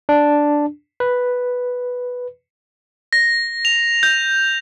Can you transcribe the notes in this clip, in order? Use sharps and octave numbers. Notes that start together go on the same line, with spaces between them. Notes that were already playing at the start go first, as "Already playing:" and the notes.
D4
B4
A#6
F7
G6